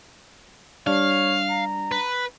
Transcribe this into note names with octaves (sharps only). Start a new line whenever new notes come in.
G3 D4 C#5 F5
A#5
B4